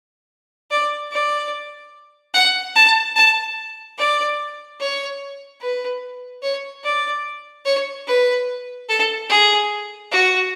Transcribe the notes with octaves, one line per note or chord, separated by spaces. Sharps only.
D5
D5
F#5
A5
A5
D5
C#5
B4
C#5
D5
C#5
B4
A4
G#4
F#4